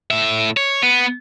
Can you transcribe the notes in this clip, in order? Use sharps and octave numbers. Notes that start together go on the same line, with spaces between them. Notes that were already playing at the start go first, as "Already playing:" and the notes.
A2 E5
C#5
B3